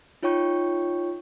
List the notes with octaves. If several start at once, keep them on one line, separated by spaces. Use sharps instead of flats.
D#4 F4 C#5 G5 C#6 G6